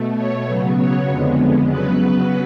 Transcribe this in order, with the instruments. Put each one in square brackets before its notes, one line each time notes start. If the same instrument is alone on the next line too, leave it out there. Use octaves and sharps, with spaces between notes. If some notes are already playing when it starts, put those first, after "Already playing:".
Already playing: [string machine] B2 A3
C#5
C#3 F#3 B3
C#5
F2 D3 G#3 B3
C#3 F#3 B3 B4